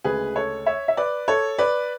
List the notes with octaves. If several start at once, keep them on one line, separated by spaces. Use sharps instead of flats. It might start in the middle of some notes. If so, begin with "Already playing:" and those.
D2 C#3 G#3 G#4 B4
A4 C#5
C#5 E5
E5
B4 D5
A4 C#5
B4 D5